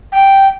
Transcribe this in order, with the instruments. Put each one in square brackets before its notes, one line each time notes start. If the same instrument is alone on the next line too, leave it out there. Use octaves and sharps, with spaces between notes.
[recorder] G5